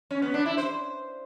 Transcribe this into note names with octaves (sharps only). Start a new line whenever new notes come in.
C#4
B3
D4
E4
C5